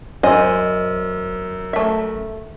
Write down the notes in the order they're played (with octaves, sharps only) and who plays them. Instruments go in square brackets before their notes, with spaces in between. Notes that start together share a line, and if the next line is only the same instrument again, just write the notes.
[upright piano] F#2 [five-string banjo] C5 D#5 G#5
[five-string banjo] A3 E5